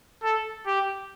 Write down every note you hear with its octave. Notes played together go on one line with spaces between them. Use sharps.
A4
G4